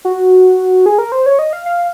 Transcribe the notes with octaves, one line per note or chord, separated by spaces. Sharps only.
F#4
G#4
A#4
C5
C#5
D#5
F5
F5